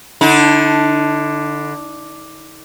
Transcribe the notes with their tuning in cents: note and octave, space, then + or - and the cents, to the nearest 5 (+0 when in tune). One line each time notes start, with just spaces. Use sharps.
D3 +0 D#4 +45